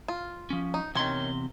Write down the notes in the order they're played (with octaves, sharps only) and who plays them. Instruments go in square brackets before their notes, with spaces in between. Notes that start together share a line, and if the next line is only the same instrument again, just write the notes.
[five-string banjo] F4
[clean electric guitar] F3 C#4
[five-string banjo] D#4
[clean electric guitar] E2 C3 C6 [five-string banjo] D#3 C#4